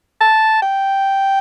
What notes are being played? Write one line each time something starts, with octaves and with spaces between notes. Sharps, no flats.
A5
G5